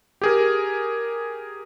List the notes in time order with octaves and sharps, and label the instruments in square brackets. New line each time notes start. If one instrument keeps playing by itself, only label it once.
[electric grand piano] G4 G#4 A#4